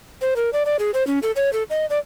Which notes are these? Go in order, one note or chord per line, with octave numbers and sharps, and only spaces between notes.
C5
A#4
D5
D5
G#4
C5
C#4
A4
C#5
A4
D#5
D5